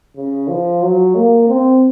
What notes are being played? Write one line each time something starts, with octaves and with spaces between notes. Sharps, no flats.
C#3
F3
F#3
A#3
C4